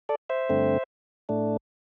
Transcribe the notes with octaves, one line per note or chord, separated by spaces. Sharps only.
A4 D5
C5 E5
G2 D3 A3 C4
A2 A3 D4